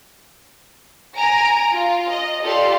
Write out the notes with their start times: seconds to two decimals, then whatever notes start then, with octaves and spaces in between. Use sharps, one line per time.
1.17 G#5 A#5 A#6 D7
1.72 F4
2.11 D#5
2.43 F4 G4 A4 D5 F5 C6